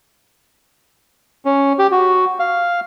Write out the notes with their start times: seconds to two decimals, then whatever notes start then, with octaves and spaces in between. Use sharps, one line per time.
1.45 C#4
1.79 G4
1.92 F#4
2.39 F5